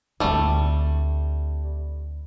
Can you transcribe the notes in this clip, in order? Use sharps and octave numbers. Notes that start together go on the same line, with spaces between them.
D2 G3 A3 C4